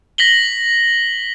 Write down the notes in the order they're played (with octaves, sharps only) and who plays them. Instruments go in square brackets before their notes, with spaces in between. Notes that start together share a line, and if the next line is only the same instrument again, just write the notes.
[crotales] A#6 B6 F#7 G7